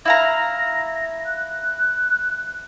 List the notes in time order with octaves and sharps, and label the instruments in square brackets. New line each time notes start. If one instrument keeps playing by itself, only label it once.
[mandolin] E4 F5 A#5 [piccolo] A#6
[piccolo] F#6